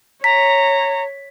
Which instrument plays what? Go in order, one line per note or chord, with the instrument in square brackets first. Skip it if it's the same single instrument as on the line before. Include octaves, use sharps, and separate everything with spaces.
[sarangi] C#5 [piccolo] A#5 [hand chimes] B6